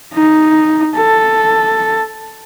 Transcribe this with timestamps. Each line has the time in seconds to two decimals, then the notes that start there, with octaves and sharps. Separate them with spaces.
0.14 D#4
0.96 A4